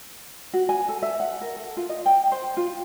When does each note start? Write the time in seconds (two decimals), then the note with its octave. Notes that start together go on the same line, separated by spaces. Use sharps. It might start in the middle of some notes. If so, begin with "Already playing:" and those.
0.53 F#4
0.69 G#5
0.89 A4
1.02 E5
1.20 F#5
1.41 A#4
1.57 A4
1.77 F4
1.89 D#5
2.06 G5
2.32 C5
2.57 F4